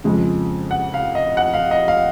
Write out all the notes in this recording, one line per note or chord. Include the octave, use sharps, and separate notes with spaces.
F2 C#3 F3 G#3
F#5
F5
D#5
F#5
F5
D#5
F5